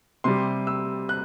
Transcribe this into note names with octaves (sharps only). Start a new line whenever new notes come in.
C3 G3 C6
E6
F#6